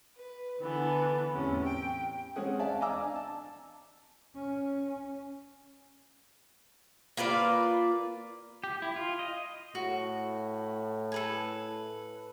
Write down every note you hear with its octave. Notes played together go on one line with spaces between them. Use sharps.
B4
D3 E3 B3 A4
E2 A2 C3 C#4
G5
G#3 C4 C#4 G#4 F#5
D5 E5 F5 G#5 A5
D#5 F5 G#5 A#5 D6 E6
D4
A5
C#4
A#3 F4 B4 D5
G4
E4
F4
D#5
A2 F#4
A4 B4 G#5